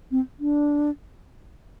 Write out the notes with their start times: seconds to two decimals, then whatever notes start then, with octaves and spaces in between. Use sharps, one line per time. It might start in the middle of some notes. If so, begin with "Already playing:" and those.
0.11 C4
0.40 D4